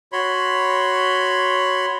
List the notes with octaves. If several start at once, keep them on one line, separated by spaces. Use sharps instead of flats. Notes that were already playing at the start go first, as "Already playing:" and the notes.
F#4 C#5 B5 C6